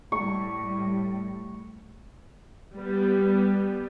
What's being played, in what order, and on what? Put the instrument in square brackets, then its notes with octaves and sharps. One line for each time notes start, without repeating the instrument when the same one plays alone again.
[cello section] A2 G3 [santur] C#6
[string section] G3 B3